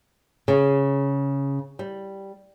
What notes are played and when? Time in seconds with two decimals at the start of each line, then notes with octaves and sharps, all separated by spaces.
0.48 C#3
1.79 G3